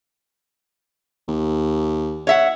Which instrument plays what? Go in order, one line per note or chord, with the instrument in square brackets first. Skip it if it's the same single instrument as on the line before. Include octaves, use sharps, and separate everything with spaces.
[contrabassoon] D#2
[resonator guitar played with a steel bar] C#5 E5 F#5